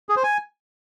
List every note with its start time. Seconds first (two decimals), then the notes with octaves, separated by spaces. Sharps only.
0.09 G#4
0.16 C5
0.24 G#5